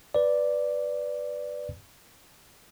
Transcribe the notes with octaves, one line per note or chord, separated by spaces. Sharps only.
B4 D5